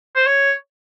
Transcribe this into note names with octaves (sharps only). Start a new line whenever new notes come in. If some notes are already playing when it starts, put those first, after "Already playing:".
C5
C#5